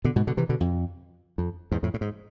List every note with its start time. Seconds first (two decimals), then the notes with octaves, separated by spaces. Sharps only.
0.04 B2 D3
0.16 G#2 B2
0.27 B2 D3
0.37 C3 E3
0.49 B2 D3
0.60 F2
1.38 F2
1.72 E2 G#2
1.83 F2 A2
1.94 A2
2.01 G#2